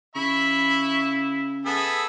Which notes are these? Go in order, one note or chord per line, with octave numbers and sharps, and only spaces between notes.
C#3 E4 E5 B5 C#6
B3 G#4 A4 E5